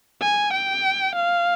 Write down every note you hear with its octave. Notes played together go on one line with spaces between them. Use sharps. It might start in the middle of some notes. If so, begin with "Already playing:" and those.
G#5
G5
F5